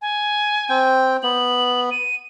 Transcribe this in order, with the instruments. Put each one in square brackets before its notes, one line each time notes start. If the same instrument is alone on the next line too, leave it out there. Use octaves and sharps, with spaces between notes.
[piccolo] G#5
[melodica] C4 G5
[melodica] B3 [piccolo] F#7
[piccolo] D#7